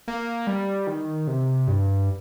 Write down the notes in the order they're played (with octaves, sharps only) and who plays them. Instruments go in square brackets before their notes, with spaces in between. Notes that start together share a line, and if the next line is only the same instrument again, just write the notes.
[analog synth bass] A#3
G3
D#3
C3
G2